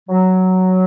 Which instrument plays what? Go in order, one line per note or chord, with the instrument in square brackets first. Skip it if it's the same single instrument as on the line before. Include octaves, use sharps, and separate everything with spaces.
[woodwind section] F#3